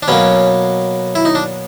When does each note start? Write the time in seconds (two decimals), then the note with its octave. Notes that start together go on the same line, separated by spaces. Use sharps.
0.03 D4
0.08 B2 F#3 A#3 C#4
1.15 E4
1.25 D#4
1.35 D4